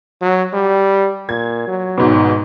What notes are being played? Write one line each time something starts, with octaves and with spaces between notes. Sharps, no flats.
F#3
G3
A#2 G#6
F#3
G#1 G#2 B2